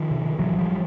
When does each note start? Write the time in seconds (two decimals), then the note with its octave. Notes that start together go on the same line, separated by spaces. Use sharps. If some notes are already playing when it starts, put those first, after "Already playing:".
Already playing: D#3 F3
0.11 C3
0.39 A1 E3 F#3
0.59 F3 G3